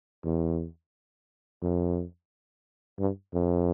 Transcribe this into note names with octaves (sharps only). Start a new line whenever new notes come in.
E2
F2
G2
F2